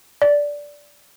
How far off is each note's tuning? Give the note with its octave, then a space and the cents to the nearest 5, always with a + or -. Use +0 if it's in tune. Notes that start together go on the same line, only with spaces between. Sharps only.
D5 -10